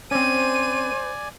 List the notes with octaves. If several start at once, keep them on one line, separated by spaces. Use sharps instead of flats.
C4 C#4 C5 D5 G#5 D#7